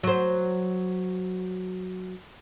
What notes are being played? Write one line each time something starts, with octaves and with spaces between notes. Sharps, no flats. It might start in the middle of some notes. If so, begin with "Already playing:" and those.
F#3 C5